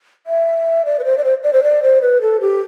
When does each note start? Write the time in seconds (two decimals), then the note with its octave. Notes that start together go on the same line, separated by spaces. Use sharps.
0.27 E5
0.85 D5
0.99 B4
1.04 C5
1.18 D5
1.24 C5
1.43 D5
1.53 C5
1.63 D5
1.83 C5
2.02 B4
2.21 A4
2.41 G4